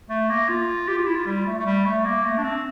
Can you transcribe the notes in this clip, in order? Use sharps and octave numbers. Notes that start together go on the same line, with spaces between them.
A3
A#3
F4
G4
F4
E4
F4
G3
A3
A3
G3
A3
A#3
A3
D4
C4